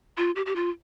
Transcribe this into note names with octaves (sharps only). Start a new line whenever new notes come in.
F4
G4
G4
F4